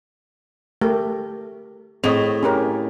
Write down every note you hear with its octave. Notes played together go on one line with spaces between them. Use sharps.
A3 G4 A#4
A2 C4 G#4 D#5
C#4 G4 A#4